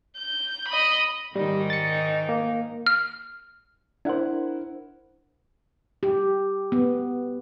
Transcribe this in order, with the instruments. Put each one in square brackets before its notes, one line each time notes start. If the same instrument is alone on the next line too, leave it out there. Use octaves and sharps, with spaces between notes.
[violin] G6
D#5 B5
[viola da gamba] G#2 D#3 D#4 [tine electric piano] G3
[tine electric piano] A6 C#7
A#3
[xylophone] F6
[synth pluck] D4 C5 [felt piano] E4 A#4 F#5
[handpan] G4
B3